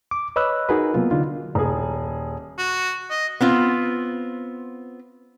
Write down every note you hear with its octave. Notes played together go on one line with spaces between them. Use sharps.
D6
B4 C#5 D#5 B5 E6 F#6
D#4 F#4 G#4 A#4 B4
C3 F#3 A#3 B3 F4
D3 D4 D#4 F4
D#1 G#4
F#4
D#5
B3 C4 F4